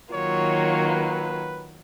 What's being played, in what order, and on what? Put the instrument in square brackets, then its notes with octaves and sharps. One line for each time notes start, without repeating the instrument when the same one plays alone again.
[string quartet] D#3 F#3 A#3 F4 [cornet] C#5
[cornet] B4